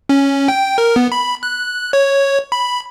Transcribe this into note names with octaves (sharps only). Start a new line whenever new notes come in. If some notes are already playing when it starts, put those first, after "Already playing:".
C#4
G5
A#4
B3
B5
F#6
C#5
B5